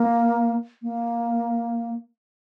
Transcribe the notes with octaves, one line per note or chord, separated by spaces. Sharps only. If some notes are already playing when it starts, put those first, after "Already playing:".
Already playing: A#3
A#3